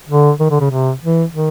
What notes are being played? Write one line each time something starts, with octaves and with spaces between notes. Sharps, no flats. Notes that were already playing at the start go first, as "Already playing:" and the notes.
D3
D#3
D3
C#3
C3
E3
D#3